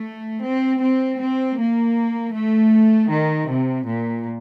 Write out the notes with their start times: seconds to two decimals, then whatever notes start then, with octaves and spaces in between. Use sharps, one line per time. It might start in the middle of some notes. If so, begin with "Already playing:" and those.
Already playing: A3
0.43 C4
0.81 C4
1.19 C4
1.57 A#3
2.33 A3
3.10 D#3
3.48 C3
3.86 A#2